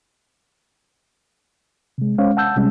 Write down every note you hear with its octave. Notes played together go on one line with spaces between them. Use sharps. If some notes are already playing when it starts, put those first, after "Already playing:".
C3 G#3
G#3 C#4 C5 C#5 F5
F#5 A5 E6 G6
C3 G3 G#3 C#4